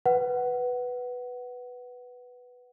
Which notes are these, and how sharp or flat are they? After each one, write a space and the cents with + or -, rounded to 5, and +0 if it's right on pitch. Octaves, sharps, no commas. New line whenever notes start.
B4 +0 F#5 +15